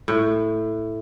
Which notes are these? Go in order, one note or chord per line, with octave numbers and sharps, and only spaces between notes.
A2